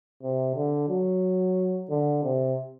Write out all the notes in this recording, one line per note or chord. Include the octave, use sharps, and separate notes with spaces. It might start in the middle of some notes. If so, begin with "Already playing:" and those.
C3
D3
F#3
D3
C3